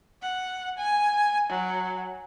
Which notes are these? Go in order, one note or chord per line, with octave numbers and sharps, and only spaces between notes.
F#5
G#5
F#3